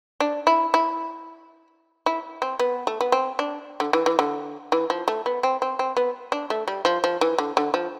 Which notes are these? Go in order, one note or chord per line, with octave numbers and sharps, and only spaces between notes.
D4
E4
E4
E4
C4
B3
A3
B3
C4
D4
D3
E3
E3
D3
E3
F3
A3
B3
C4
C4
C4
B3
D4
A3
G3
F3
F3
E3
D3
D3
F3